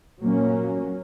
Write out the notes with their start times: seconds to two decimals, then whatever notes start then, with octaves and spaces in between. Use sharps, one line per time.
0.20 A#2 F#3 A#3 C#4